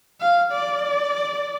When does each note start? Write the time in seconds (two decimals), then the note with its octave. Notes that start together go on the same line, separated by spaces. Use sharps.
0.20 F5
0.52 D5